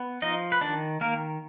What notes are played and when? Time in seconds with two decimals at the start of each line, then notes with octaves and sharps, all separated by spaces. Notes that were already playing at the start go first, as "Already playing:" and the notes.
Already playing: B3
0.22 F3 D#4 D#5
0.52 B4
0.61 D#3 D4 D5
1.01 D#3 A#3 A#4